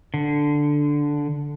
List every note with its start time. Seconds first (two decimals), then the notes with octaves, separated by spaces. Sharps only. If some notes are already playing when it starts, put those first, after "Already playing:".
0.14 D3